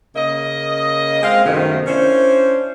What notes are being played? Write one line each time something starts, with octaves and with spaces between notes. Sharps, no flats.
C#3 A#3 D#5
G#3 C4 F5
F#2 C3 D#3 A3 B3
C#4 D4 E4 C5